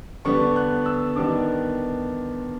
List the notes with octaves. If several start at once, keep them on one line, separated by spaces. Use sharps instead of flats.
D3 G3 B3 D4 C#6
F#6
E6
D#3 G3 B3 D4 D6